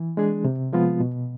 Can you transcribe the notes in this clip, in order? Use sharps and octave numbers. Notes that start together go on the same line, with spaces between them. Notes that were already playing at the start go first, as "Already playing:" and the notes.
Already playing: E3
G#3 D4 G#4
C3
F3 G#3 B3 F4
B2